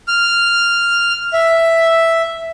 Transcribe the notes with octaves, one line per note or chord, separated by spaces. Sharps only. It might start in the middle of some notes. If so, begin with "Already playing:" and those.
F6
E5